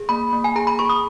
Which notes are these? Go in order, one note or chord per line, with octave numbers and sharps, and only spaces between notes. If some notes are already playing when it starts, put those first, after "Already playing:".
Already playing: G#4
A#3 B5
A#3
G#5
G#4 A#5
B5
G#4 C#6
D#6